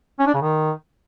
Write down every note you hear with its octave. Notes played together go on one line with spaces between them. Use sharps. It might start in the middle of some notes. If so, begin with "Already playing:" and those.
C#4
D4
C#3
D#3